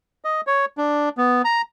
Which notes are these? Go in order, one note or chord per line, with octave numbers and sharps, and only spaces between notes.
D#5
C#5
D4
B3
A#5